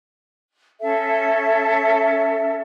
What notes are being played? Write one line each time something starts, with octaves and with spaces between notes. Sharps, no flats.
C#4 A4 E5 A5